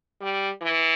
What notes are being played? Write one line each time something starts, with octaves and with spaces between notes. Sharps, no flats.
G3
E3